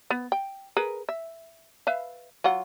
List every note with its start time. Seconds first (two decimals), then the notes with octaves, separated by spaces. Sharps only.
0.10 B3
0.32 G5
0.77 G#4 A#4 B4
1.09 E5
1.87 B4 E5 F5
2.44 F#3 F4 F#5